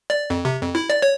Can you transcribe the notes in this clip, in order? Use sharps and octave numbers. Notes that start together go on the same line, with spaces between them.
D5
F2
C3
F2
E4
D5
C#5